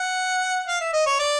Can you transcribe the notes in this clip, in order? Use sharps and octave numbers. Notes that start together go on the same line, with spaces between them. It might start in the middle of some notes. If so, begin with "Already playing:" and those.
Already playing: F#5
F5
E5
D#5
C#5
D5